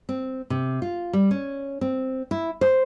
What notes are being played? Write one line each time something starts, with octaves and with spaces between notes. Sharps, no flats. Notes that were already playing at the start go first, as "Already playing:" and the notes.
C4
C3
F4
G3
C#4
C4
E4
C5